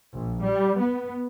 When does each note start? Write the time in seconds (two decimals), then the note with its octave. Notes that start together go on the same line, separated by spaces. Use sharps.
0.13 A#1
0.42 G3
0.78 B3